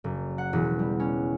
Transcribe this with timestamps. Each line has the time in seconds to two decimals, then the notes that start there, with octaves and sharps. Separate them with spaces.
0.04 F#1
0.38 F#5
0.53 E1
0.79 G3
1.00 C#4